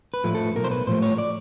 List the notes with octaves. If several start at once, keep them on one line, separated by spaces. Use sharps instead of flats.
B4
A2 F3 A3
A4
B1 A#4
C5
B4
A2 F3 A3 C5
C#5
D5